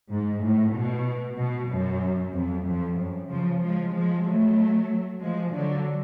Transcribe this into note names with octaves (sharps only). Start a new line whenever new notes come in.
G#2
A2
B2
B2
F#2
F2
F2
F#2
C#3 F3
F3 G#3
F3 G#3
F#3 A3
F3 G#3
D3 F#3